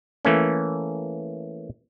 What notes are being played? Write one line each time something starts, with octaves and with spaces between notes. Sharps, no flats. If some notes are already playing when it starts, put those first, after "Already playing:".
E3 A3 A#3 C#4